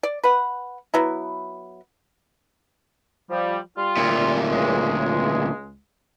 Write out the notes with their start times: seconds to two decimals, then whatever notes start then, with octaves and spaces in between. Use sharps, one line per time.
0.03 D5
0.23 B4 F#5
0.94 F#3 B3 E4
3.30 F3 G3
3.77 G3 F4
3.97 D2 A#2
4.50 C#2 G#3